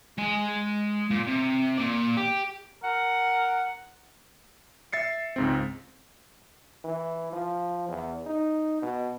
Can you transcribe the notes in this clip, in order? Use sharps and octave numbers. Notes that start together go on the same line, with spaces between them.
G#3 G#5
A#2
C3
A#2 D5
G4
A#4 F#5
E5 A6 C7 C#7
C#2 G#2 C4
E3
F3
E2
D#4
B2